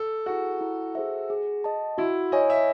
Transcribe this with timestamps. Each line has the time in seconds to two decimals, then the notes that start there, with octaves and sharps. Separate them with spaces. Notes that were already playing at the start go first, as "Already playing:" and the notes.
Already playing: A4
0.26 E4 F#4 G#4
0.61 E4
0.95 G#4 C5 E5
1.30 G#4
1.64 D#5 A5
1.98 E4 F#4
2.32 C#5 D#5 G#5
2.50 E5